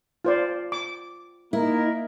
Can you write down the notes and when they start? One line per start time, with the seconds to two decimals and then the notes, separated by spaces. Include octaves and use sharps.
0.25 F4 C5 D5
0.72 D6
1.53 A#3 D#4 E4 A#4